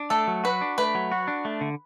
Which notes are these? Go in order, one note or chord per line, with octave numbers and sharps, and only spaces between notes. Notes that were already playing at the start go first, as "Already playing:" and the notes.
Already playing: D4
A3 A4
F#3
F#4 B4
D4
A3 B4
F#3
F#4
D4
A3
D3